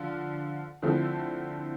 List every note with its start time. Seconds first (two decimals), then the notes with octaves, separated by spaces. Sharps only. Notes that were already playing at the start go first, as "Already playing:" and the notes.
Already playing: D3 F3 F4
0.82 D3 F3 A3 C4 E4